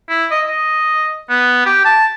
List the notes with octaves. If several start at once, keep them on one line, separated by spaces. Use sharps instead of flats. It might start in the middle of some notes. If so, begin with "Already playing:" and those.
E4
D#5
D#5
B3
G4
A5